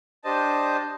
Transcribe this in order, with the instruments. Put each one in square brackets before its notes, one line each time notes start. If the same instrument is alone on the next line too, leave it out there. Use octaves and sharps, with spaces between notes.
[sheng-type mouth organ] D4 G4 C5 D#5 A5